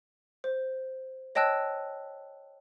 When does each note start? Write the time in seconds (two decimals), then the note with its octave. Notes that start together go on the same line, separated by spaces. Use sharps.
0.44 C5
1.35 C#5 D#5 G5 A5 E6 F#6